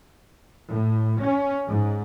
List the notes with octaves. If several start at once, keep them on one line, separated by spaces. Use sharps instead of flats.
A2
C#4
G#2